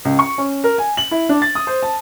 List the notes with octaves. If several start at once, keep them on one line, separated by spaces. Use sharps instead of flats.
C#2
C#6
C#4
A#4
G#5
F#7
E4
D4
A6
D#6
C5
A5